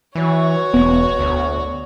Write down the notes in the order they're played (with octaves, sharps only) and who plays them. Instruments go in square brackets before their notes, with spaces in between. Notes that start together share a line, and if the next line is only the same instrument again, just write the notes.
[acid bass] E3 [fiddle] F#4 C#5
[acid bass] E1 [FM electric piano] B3
[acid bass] D2